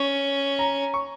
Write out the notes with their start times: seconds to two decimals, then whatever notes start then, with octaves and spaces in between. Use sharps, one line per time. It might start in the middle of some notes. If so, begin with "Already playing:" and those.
Already playing: C#4 C#6
0.59 A#5
0.94 C#6